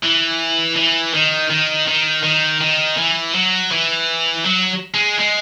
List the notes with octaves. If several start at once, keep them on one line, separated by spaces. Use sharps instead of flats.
E3
E3
D#3
D#3
D#3
D#3
D#3
E3
F#3
E3
F#3
G#3
G#3